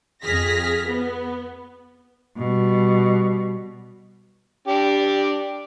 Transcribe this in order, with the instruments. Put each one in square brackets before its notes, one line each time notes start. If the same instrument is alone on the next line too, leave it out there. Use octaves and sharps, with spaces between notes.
[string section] F2 G#4 F6 A#6 B6
B3
[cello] B2 G3
[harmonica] D4 G4